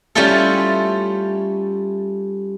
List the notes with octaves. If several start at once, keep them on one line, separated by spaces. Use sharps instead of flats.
G3 A3 C#4 E4 F4 A4